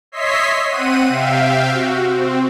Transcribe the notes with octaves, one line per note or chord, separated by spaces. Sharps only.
C#5 D#5 E5 C6 B6 C7
C4 F#5 D#7
C3 E5 F5 G5
F#4
C4